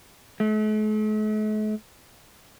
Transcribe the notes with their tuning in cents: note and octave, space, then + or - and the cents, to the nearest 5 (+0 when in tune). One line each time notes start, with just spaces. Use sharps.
A3 -45